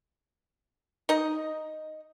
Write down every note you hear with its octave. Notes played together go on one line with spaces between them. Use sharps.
D#4 D#5